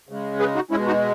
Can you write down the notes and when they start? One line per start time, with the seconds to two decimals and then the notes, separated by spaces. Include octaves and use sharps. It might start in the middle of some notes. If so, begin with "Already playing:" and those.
0.09 C#3 G#3
0.39 G#4 B4
0.55 D#4 F#4
0.71 B2 G#3 C#4 E4
0.87 D#4 F#4